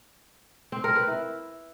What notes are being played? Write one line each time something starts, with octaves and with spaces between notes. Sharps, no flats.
C4
A#4
B4
E4